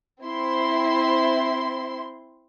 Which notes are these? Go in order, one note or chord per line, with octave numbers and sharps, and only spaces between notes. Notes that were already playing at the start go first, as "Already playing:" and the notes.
C4 E4 C6